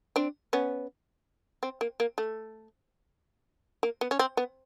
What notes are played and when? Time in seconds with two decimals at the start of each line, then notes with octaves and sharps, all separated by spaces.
0.16 C4 D4
0.53 B3 C#4
1.63 C4
1.81 A#3
2.00 A#3
2.18 A3
3.83 A#3
4.01 B3
4.11 C#4
4.19 C4
4.37 B3